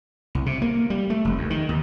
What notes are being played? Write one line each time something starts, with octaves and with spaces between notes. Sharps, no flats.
C2
C3
A#3
G3
A3
F1
D#2
D#3
D#2